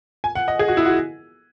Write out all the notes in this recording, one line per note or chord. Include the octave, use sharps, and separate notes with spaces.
G#5
F#5
D#5
G#4
F#4
E4
F#4